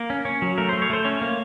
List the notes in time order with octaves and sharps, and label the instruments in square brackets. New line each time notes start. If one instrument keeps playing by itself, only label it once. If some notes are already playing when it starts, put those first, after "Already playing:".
Already playing: [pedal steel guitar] A#3 A#4
C#4
C#4
F#3
A3 A#4
A3 C5
C#5
A3 C5
C#4 C#5
A#3